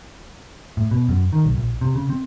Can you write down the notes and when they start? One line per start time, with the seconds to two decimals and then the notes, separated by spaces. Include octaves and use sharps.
0.77 A2
0.91 B2
1.09 F#2
1.33 D#3
1.45 B1
1.57 A#1
1.81 C3
1.95 C#3
2.10 C4